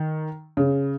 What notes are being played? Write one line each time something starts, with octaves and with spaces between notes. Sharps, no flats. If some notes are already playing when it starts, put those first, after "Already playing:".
Already playing: D#3
C#3